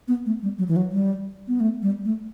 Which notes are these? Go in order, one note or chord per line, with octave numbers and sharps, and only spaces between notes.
B3
A3
G3
F#3
E3
F#3
G3
B3
A3
G3
A3